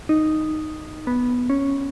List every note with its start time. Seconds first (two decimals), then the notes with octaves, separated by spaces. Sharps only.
0.09 D#4
1.07 B3
1.50 C#4